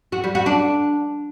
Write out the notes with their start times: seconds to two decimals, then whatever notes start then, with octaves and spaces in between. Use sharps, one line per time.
0.12 F#4
0.24 G3
0.35 F#4
0.46 D4